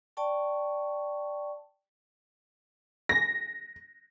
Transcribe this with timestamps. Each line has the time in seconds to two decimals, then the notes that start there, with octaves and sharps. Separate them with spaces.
0.17 D5 G5 A5 C#6
3.09 A#6